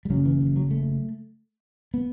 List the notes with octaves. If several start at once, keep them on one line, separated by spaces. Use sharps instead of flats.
G3
F#1 F#2 C#3 F#3
E3
E3
F#3
A3
B3